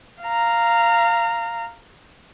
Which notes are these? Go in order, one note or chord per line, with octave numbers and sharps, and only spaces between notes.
F5 A#5